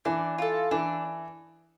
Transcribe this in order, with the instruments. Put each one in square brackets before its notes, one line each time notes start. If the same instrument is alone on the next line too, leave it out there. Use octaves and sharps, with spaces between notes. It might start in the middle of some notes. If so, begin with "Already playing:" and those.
[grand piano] E3 [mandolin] D4
[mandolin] F4 A4
[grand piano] E3 [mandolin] D4